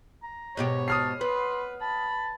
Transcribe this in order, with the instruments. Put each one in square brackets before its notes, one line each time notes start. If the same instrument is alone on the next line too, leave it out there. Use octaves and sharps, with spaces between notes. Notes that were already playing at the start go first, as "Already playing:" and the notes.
[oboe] A#5
[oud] G#2 B2 G4 [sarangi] C#5
[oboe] A5 [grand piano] D#6 F6 C7
[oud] B3 [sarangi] B4 [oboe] C6
[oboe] A5 [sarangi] B5